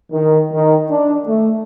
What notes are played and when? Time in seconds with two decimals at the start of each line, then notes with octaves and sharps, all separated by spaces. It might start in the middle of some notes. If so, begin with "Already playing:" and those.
0.12 D#3
0.52 D#3
0.90 D4
1.26 A3